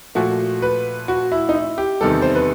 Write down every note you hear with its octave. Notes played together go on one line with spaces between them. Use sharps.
A#2 F3 A3 F#4
B4
F#4
E4
D#4
E4
G4
E2 C3 D#3 G3 A4
C5
B4